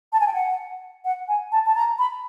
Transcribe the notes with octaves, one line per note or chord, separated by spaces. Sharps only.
A5
G#5
G5
F#5
F#5
G#5
A5
A5
A#5
B5